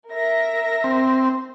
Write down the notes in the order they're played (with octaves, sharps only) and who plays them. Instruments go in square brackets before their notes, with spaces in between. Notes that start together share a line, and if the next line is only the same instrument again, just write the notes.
[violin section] A#4 E5 A#6
[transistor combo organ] C4